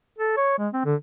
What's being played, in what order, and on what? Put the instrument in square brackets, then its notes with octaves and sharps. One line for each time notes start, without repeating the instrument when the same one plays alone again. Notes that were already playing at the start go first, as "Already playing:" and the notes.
[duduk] A4
C#5
G#3
C4
D3